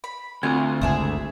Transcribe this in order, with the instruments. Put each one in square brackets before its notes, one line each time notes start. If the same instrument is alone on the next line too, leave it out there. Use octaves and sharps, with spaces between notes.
[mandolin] B5
[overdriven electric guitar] D2 [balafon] C4 [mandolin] F4 F#5
[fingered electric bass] G1 C#2 [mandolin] G#4 E5 D#6